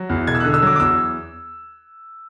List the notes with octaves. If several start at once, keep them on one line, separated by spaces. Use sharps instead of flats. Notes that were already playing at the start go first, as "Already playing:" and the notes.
Already playing: F#3
E2
E1 G#6
E6
D3 F#6
E6
F#3 D6
D6
E2 E6